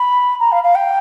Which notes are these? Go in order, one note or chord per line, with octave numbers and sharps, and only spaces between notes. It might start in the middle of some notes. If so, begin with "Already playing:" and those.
Already playing: B5
A#5
F5
F5
G5